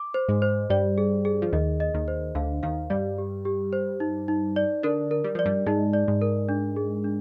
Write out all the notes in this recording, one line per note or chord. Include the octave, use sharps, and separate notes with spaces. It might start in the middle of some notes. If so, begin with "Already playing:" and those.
Already playing: D6
C5
G#2 G#3
C5
G2 G3 D5
G#4
G#4
F3
D#2 D#3 D#5
D#5
D#2 D#3
C5
D2 D3 F5
D#2 D#3 F5
G2 G3 D5
G4
G4
C5
D#4
D#4
D5
D3 D4 A#4
A#4
G3
F3 D5
G2 G3
G#2 G#3 D#4
D5
G#2 G#3
A#4
D4
G#4
D4